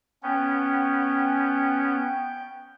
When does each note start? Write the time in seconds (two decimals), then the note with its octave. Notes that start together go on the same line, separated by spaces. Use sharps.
0.23 B3 C#4 G5